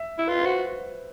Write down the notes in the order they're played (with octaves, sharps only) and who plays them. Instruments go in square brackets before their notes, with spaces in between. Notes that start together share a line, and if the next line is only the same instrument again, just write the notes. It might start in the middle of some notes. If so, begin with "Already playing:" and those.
Already playing: [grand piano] E5
[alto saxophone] E4
[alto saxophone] F4 [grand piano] B4
[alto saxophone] F#4 [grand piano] C5